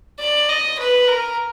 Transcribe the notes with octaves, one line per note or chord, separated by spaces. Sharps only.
D5
D#5
B4
A#4